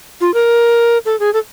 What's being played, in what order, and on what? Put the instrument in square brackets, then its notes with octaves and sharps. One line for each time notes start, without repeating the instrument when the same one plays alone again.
[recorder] F4
A#4
A4
G#4
A4